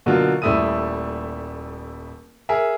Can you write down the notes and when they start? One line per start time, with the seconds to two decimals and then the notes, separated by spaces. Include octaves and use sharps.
0.06 B2 D3 F#3 A#3 F4
0.42 D#1 G3 A3 E4 D#6 D#7
2.49 G#4 A#4 E5